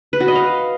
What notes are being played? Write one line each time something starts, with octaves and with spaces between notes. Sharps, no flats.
B4
F#4
D#5
F5